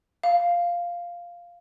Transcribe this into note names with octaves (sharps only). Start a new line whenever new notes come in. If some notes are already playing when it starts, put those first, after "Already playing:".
F5